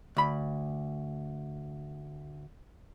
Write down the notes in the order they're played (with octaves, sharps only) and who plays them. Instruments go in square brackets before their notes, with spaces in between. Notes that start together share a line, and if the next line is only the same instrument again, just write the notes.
[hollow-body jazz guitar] D2 B5